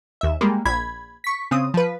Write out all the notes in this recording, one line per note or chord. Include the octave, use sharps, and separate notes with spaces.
D#2 E5
G3 G#3 A#3
A#1 B5 G#6
C#6 B6
C#3 C4 D#6
F3 B4